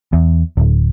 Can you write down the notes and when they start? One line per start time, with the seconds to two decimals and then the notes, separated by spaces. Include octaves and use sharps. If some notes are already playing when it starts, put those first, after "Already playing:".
0.13 E2
0.57 D1